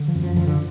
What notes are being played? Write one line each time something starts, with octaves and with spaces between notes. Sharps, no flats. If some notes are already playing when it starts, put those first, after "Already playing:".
Already playing: D3
F3
F#2
F3
D3 F3
D3